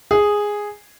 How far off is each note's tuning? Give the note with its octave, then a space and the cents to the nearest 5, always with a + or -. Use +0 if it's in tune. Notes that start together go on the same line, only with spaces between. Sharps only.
G#4 -5